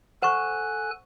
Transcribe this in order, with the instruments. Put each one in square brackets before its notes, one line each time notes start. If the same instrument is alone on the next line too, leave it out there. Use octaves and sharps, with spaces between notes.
[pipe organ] A4 G#5 F#6 [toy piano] C5 C#6 [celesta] F#5 E7